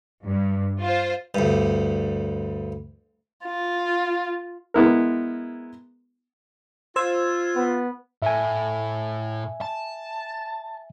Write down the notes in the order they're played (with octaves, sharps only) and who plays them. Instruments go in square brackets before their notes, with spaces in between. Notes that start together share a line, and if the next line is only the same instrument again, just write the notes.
[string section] G2
F4 C5
[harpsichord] D2 G2
[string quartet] F4
[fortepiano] G#3 B3 E4 A#4
[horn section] F4 [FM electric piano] C5 E6 G#6
[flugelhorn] B3
[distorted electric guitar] A2 [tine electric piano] E5 G#5
[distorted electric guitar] A5